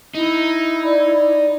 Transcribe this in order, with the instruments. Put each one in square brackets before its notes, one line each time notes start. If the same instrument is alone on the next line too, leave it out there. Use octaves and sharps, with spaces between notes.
[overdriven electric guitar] D#4 [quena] E4
[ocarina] D5